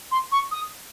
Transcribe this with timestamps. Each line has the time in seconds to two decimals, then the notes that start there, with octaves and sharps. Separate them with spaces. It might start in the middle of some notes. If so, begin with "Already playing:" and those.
0.11 C6
0.31 C#6
0.51 D#6